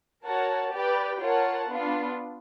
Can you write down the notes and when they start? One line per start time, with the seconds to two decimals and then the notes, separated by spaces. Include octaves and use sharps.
0.24 F#4 A#4 C#5 F#5 A5
0.72 G4 B4 D5 G5
1.20 F4 A#4 C#5 F#5 A5
1.68 B3 D4 F4